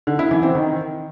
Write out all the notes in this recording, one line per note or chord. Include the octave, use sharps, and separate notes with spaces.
D3
E4
E3
C4
D#3